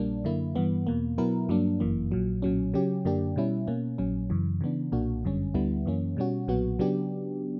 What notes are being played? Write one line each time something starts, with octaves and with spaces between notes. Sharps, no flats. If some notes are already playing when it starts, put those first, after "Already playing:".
Already playing: A#1 A#2 G3 A#3 D4
F#2 D3 A#3 E4
G2 E3 B3
E2 B2 A#3
B2 F#3 B3 E4 A#4
G2 F#3 A#3 D4
G1 F#2 E3 A#3
A#1 A#2 F#3
B1 A#2 F#3 C#4
C#3 F#3 C#4 G4
F#2 D3 A#3 D4 G4
B2 G3 C#4 E4
B2 A#3 C#4
A#1 A#2 F#3 C#4
F#2 C#3 E3
C#3 E3 B3 D4
B1 A#2 A#3 D4 F#4
G1 F#2 D3 G3 C#4
D2 D3 G3 B3 E4
F#2 E3 A#3 C#4
B2 G3 C#4 F#4
B1 A#2 F#3 B3 F#4
C#3 F#3 B3 D4 G4